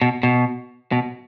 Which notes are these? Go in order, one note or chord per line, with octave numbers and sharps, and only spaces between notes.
B2
B2
B2